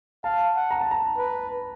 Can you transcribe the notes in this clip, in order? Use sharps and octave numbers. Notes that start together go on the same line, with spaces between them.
F5 A5
F#5
A#5
A5
A#5
B4